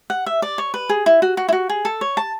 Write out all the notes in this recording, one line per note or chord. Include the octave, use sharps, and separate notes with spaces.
F#5
E5
D5
C#5
B4
G#4
E4
F#4
F#4
E4
F#4
G#4
A4
C#5
A5